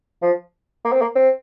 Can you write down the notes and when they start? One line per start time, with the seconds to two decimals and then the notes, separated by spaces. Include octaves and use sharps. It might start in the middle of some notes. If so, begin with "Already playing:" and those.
0.22 F3
0.85 A#3
0.92 C4
1.02 A#3
1.15 C4